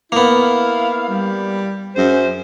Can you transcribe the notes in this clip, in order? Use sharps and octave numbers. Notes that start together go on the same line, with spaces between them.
A#3 B3 E4 F5
G3
F#2 G#4 C5